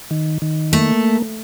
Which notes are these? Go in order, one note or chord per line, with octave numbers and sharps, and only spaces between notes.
D#3
D#3
A3 A#3